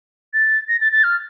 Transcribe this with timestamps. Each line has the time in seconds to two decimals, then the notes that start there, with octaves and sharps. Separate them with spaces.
0.34 A6
0.69 A#6
0.81 A6
0.92 A6
1.04 F6